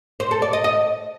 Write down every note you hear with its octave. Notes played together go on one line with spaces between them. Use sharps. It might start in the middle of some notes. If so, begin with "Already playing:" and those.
C5
A4
D5
D#5
D#5